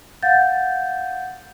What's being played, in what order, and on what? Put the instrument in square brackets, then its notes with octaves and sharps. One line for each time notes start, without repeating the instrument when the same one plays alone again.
[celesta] F5 F#5 G6 A6